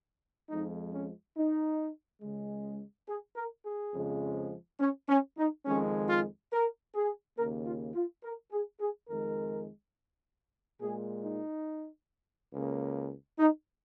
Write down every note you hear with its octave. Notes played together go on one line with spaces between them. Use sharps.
F2 F3 G#3 D#4
C#4
D#4
C#2 C#3 G#3
G#4
A#4
G#4
F2 C#3 F3 G#3
C#4
C#4
D#4
F2 D#3 G#3 C#4
F4
A#4
G#4
D#2 C#3 A#3 A#4
F4
F4
A#4
G#4
G#4
F2 D#3 G#3 A#4
A#2 G#3 G#4
D#4
C#2 C#3 A#3
D#4